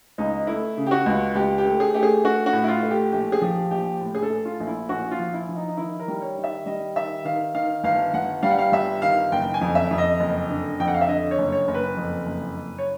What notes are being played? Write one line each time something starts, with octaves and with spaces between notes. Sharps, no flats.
C#2 D#4
A3 E4
C#3
G4
F#4
C#2
C#2 G4
G4
A3
G#4
A3 G4
G#4
A3 F#4
F#4
A2
E4
F4
A3
G4
A#1 G4
G#4
F3 G4
A#1 G4
A2
G#4
A4
A3
F4
A#1
E4
A#1 F#4
F4
F3
E4
F3
D#4
D#4
D#3 E4
A#4
G3
C#5
D#3
E5
G3 D#5
D#3 E5
D#3 F5
D#3 F5
G1 F5
G1 F#5
G3 F5
F#5
F5
G1 E5
D#3 F5
F#1 G5
G#5
F2
E5
F2
D#5
F#1
D3
F2 G5
F#5
F5
E5
D3 D#5
C#5
F#1
C#5
F#1
B4
F2
F#1
F#1
C#5